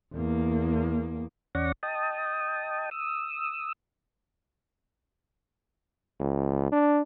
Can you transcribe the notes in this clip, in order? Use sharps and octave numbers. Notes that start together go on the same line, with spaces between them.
E2 A#3
E2 C#4 D5 F#5 C#6 A#6
D#5 G5 A5 D#6
D#6 E6
C#2
D4